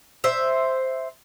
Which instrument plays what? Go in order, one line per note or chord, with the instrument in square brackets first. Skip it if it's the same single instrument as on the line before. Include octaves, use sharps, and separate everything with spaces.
[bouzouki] C5 E5